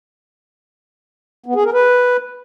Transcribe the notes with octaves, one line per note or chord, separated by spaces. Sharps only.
B3
G#4
A#4
B4